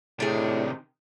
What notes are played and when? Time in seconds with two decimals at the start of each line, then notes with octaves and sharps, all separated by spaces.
0.20 A2 C3 D#3 D4 G#4